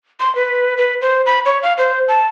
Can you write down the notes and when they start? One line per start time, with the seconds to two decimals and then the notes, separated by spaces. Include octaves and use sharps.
0.20 C6
0.35 B4
0.78 B4
1.01 C5
1.26 B5
1.45 C#5
1.63 F5
1.78 C5
2.08 A5